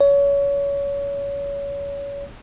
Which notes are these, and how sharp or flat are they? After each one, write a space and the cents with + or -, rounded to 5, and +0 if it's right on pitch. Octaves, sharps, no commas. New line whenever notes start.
C#5 +25